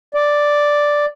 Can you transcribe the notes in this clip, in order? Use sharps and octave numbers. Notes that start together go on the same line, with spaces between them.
D5